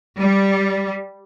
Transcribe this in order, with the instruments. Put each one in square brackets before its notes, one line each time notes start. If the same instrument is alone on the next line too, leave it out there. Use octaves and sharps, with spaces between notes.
[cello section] G3